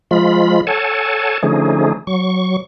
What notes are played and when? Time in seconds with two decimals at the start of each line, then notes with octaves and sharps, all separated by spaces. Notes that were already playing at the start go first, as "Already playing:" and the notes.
0.11 F3 G#3 F4 B5
0.67 A4 C#5 F#5 G#5 A5
1.43 D3 F3 A3 C#4 D#4 G#4
2.07 F#3 C#6